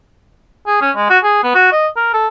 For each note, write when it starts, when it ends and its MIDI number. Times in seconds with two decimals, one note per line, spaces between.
0.66 0.78 68
0.81 0.91 61
0.96 1.10 56
1.10 1.18 66
1.24 1.42 68
1.43 1.55 59
1.55 1.70 66
1.72 1.87 75
1.96 2.10 70
2.14 2.27 69